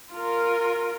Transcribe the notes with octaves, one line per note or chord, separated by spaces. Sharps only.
F4 A#4